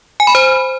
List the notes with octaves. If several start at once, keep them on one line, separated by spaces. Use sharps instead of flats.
G#5
B5
C5